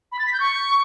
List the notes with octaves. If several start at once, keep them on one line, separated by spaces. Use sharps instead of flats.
B5
A6
B6
G6
C#6